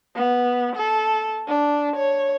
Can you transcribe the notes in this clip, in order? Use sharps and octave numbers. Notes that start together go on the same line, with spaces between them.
B3
A4
D4
C#5